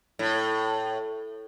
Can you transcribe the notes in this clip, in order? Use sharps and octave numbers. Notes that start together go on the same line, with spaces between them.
A2